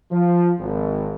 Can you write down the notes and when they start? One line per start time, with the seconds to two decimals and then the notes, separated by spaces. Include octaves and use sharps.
0.11 F3
0.59 G#1